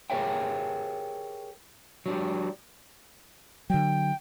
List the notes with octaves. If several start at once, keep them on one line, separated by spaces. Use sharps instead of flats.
G4 G#4 A#4 C#5 E5 G5
F#3 D4 G4
D3 F#3 G5